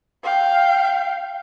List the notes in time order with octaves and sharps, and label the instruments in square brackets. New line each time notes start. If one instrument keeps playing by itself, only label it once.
[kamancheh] F5 G5